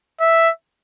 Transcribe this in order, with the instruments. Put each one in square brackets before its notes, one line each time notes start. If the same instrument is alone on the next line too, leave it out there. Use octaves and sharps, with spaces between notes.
[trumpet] E5